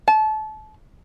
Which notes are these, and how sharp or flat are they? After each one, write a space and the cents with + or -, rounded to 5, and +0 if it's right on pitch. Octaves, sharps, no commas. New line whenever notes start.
A5 -30